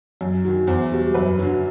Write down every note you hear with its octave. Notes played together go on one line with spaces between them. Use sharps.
F#2
D#3 F#3
E2 C5
B2 G3
F#2 B4
D3 F#3